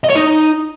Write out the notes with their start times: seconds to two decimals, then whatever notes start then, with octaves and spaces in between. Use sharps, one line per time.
0.04 D#5
0.10 C#5
0.16 D#4